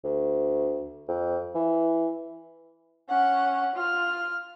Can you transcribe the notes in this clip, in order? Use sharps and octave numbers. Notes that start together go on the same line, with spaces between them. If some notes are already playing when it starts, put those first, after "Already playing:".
D2
F2
E3
C#4 F#5
F4 F6